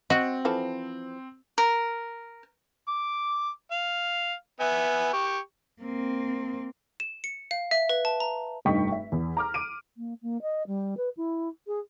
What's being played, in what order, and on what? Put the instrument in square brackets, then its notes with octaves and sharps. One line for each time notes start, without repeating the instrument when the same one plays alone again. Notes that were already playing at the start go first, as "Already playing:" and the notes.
[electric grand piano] C4 [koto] F#4 [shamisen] D#5
[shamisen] E3 F3 A4
[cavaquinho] A#4
[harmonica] D6
F5
B3 E5 G#5
G4 C#6
[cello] A#3 C4
[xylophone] E7
C#7
F5
E5
B4
A5
A#5
[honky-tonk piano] F1 G2 D#4 G5 C#6 B6
E5
E2
A#5 D6 F6
D6 D7 D#7
[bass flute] A#3
A#3
D#5
G3
B4
E4
G#4